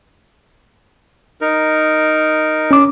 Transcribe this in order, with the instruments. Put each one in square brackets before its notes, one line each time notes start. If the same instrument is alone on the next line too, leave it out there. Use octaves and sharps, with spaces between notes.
[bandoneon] D#4 A#4
[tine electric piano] C#4 D6